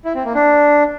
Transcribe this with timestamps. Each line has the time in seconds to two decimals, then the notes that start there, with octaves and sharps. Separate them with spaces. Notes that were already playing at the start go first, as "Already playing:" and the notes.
0.05 E4
0.15 C4
0.25 A#3
0.35 D4